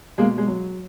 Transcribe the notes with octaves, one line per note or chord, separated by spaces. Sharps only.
B2 G#3 A#3
G#3
F#3